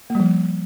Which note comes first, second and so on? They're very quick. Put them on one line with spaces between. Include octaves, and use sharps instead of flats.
A#3 G3 F3